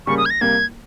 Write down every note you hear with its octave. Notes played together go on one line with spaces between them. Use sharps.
C#3 G3 A#3 C#4 C#6
D#6
G#6
A#6
C3 G3 A#3 G#6